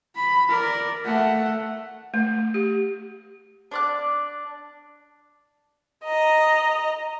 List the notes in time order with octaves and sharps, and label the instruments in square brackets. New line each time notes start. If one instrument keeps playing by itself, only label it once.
[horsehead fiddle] B5
A#4 D5
A3 F#5
[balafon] A3
G4
[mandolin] D4 D5 F#6
[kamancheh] D#5 A#5